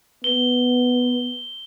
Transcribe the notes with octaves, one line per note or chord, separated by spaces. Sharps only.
B3 G7